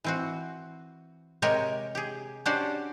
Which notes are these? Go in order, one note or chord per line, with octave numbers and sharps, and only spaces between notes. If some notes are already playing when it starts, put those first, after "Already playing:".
E3 C4 F#4
C3 G#3 G4 A#4 C#5 G#5
G4 G#4
C#4 D4 F#4 G4 C5 D5